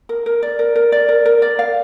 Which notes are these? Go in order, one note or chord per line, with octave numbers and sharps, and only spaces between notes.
A#4
A#4
D5
A#4
A#4
D5
A#4
A#4
D5
F5